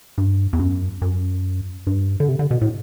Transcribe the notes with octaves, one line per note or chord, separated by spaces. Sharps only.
G2
E2
F#2
F#2
G2
D3
C3
D3
B2
A2